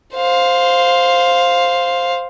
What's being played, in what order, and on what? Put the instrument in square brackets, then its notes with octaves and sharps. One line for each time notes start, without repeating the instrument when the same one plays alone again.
[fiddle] C5 F5